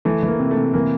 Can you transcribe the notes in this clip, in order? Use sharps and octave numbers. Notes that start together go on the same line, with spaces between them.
E3 A3
E3
A#3
C3
A3
C3
E3 A#3